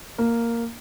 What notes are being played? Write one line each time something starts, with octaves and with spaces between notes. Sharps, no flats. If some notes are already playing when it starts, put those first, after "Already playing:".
A#3